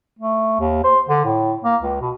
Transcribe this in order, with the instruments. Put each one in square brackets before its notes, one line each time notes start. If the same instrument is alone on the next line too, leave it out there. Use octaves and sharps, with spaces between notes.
[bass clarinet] A3
D#2
C5
D3
A2
A#3
C#2
B2